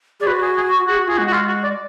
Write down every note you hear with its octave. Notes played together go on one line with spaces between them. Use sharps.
G#4 D5
F#4 B4
G#4
G#4
F#4 G#4
F#4
F4 G#4
G#3 F#4
F#4
F4
F#4
D5